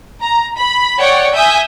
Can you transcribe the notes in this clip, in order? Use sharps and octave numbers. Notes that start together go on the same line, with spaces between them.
A#5
B5
C#5 D5 F#5 G5
E5 G#5 D#6 G6 G#6